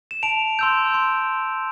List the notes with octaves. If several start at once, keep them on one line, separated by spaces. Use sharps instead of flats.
E7
A5 D7 F7
C6 E6 G6
C6